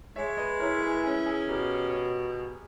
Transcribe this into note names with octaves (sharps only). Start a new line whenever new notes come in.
G#3 C#5 E5
B4 D#5
E4 A#4 C#5
G#4 B4
C#4 G#4
G#4
B2 G4 A#4